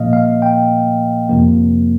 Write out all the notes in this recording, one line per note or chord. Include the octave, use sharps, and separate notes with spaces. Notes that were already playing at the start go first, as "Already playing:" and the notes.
Already playing: A#2 F3 A#3 D#5 F5
F5
G5
F2 C3 F3 A#3